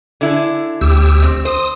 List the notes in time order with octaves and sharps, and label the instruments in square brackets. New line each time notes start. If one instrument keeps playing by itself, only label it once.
[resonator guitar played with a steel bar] D3 E4 G#4
[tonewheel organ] D2 G4 E6
[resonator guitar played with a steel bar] C4
[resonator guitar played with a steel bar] C5 [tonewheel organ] D#6